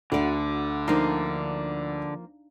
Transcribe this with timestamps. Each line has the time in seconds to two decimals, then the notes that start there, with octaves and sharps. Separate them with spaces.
0.12 D2 D3 F#4 D5
0.88 F3 A#3 D4 D#4 F5